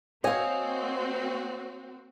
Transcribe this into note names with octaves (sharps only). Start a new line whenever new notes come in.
A#3 C4 F#4 C#5 D#5 F5 G#5